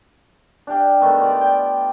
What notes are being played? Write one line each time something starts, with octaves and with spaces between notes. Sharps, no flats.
D4 G4 F5 G5
D#3 A3 B3 D#4
F4 D5
G5